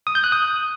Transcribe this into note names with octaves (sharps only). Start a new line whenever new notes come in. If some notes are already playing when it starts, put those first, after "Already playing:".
D#6
G6
F#6
D#6